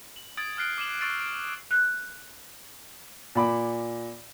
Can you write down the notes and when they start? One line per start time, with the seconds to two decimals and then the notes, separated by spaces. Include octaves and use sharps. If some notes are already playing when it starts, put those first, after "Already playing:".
0.16 F#7
0.37 D#6 G#6 A6 D7 F#7
0.57 D#6 F6 F#6 C7 D7
0.78 D6 C7 D#7 E7 F#7
1.01 C#6 E6 A6 C7 D7
1.20 D7
1.71 F#6
3.35 A#2 B5 D6